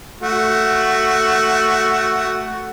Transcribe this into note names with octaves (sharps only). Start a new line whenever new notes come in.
A3 F#4